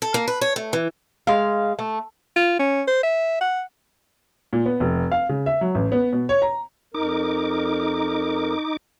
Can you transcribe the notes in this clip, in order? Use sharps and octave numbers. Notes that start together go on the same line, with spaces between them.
A4
A#3
B4
C#5
A3
E3
G#3 F5
A3
F4
C#4
C5
E5
F#5
A#2
B3
F1
F5
C#3
E5
F#3
A1
B3
B2
C#5
A#5
F2 D#4 A#4 D6